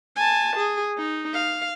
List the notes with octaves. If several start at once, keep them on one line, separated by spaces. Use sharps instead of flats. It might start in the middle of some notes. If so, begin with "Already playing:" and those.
G#5 A5
G#4
D#4
F5